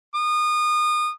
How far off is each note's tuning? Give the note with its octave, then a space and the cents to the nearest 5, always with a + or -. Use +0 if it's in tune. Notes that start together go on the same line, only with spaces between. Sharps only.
D#6 -30